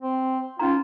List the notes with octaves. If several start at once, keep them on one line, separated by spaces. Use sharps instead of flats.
C4
C#4 D#4 F4 A#5